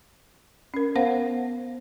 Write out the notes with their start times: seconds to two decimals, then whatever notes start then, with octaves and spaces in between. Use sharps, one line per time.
0.74 C#4 A#4
0.95 B3 C5 F5 F#5